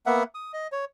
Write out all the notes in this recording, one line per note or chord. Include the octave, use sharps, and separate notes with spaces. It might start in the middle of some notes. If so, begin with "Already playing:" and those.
A#3 B3 E5 F#5
D#6
D#5
C#5